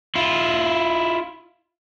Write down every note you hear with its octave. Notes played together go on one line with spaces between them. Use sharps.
E4 F4